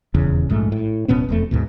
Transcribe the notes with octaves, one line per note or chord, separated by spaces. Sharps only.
D#1 E2 C#3
A#1 G#2 A3
A2
D1 B2 B3 C#4
E1 F2 A3
D2 G#2 B2